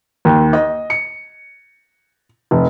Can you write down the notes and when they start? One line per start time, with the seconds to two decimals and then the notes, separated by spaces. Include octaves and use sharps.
0.25 D#2
0.53 D#5
0.90 C#7
2.51 F1